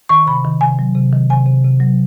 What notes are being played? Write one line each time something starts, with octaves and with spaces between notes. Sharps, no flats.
D#3 C#6
C3 B5
D#3
C3 G#5
F#3
C3
D#3
C3 G#5
C3
C3
F#3